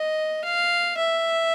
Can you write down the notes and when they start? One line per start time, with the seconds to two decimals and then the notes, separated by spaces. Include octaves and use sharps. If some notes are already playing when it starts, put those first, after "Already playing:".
Already playing: D#5
0.44 F5
0.98 E5